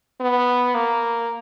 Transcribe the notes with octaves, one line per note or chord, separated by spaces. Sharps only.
B3
A#3